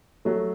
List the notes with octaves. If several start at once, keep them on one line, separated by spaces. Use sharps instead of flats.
F#3 A3